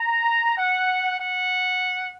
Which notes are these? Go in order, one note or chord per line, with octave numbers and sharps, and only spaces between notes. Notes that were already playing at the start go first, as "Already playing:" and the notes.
Already playing: A#5
F#5
F#5